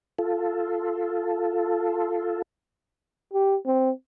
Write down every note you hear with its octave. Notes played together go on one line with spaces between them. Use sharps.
F4 A4
G4
C4